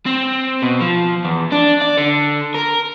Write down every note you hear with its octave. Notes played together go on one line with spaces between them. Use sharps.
C4
B2
F3
E2
D4
D5
D3
A#4